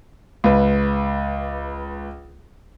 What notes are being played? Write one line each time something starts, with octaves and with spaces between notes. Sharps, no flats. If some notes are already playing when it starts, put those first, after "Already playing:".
C#2 B4